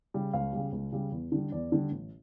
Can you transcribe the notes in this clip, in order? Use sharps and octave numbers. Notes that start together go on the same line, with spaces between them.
C#3 G3
C#2 F5
C#3 G3
C#2
C#3 G3
E2
D3 G3
E2 D5
D3 G3
A1